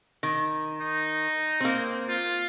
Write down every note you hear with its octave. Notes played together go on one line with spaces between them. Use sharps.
D#3
D#4
A#3 C4
F4